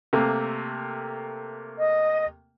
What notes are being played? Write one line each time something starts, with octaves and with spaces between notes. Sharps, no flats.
C3 A3 A#3
D#5